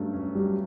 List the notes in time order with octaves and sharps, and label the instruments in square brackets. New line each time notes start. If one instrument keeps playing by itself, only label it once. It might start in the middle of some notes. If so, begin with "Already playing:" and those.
Already playing: [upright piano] G2 F#3 A3 C#4
C#4
[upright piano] F#3 [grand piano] G3